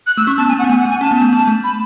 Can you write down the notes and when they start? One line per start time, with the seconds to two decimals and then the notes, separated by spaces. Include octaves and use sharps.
0.07 F#6
0.17 A3 E6
0.27 C#4 C#6
0.38 B3 A5
0.48 G#5
0.53 B3
0.59 F#5
0.64 B3
0.69 A3 G#5
0.80 F#5
0.85 A3
0.90 G#5
1.01 C#4 A5
1.11 B3
1.22 A3
1.32 A3 A5
1.48 A3
1.64 B5